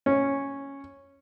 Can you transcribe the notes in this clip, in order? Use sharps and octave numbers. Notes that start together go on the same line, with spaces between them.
C#4